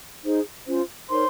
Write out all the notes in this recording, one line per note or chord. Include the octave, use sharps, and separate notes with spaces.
D#4 G#4 C5
C#4 F4 C5
D#4 A#4 C5 C#5 C6